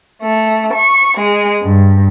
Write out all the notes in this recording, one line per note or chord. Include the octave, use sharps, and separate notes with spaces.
A3
C#6
G#3
G2